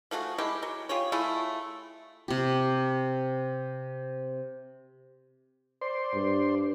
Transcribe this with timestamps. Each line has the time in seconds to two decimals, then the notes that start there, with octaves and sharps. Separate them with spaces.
0.11 F3 A3 F#4 G#4
0.38 G#3 E4 G4
0.63 F#3
0.89 F4 G4 G#4 C#5
1.12 A3 E4 F4 G#4
2.28 C3 G4
5.82 C5 D5 C6
6.14 G2